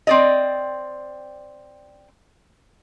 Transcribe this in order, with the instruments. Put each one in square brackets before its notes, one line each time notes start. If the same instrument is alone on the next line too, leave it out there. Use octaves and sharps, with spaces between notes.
[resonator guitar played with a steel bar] C4 D5 D#5